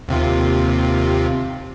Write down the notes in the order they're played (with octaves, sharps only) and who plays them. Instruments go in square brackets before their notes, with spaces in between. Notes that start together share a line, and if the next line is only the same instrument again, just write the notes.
[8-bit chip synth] D#2 C3 F4